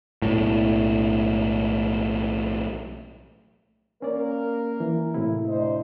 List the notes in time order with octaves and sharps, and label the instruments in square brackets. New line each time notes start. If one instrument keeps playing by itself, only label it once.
[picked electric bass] B1 A2
[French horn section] A#3 A#4 [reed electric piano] C#4 D5
[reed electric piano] E3
A2 C3 E4
[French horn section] D2 C5 D#5